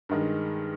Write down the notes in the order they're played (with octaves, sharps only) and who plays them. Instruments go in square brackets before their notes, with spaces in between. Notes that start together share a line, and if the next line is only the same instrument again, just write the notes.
[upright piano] G2 D#3 G#3